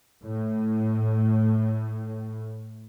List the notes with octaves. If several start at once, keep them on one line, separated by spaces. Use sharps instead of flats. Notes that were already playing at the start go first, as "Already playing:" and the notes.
A2